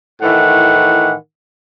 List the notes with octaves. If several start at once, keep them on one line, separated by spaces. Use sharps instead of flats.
A2 D#3 E3 F#5